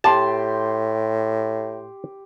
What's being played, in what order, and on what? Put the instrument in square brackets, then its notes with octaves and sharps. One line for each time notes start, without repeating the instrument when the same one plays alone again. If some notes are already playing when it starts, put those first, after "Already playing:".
[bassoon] A2 [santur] G4 C6 [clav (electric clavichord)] A5